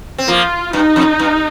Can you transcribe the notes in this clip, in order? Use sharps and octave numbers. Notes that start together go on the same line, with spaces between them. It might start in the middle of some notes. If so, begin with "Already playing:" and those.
C4
F3 A#3 F4
G2 D#4
F2
G2